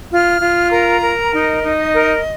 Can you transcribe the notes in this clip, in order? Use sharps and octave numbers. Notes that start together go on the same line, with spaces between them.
F4 F6
F4
A#4 A#5
A#4
D#4 D#5
D#4
A#4